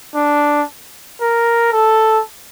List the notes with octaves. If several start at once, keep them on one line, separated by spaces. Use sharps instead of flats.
D4
A#4
A4